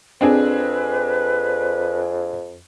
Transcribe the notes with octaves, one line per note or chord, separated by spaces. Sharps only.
F2 C4 D4 G#4 B4